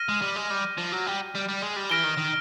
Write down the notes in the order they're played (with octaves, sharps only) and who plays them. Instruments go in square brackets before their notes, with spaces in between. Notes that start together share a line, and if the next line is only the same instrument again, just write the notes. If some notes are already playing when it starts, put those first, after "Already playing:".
Already playing: [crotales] F6 A#6 D#7
[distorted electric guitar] G#3
G3
G#3
G3
F3
F#3
G3
G3
G3
G#3
G3
[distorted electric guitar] E3 [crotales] F6 A#6 D7 G7
[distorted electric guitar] D#3
D#3